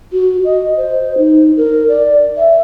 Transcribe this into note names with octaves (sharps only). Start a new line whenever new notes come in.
F#4
D#5
C5
D#4
A#4
D5
E5